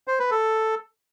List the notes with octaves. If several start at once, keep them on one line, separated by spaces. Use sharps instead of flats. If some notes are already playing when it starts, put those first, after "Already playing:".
C5
B4
A4